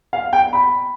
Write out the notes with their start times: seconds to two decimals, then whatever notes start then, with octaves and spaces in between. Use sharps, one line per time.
0.13 F5
0.33 G5
0.53 B5